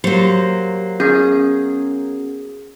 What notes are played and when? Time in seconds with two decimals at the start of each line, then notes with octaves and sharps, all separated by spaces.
0.04 F#3 A#3 G4 C5
1.00 B3 C#4 G#4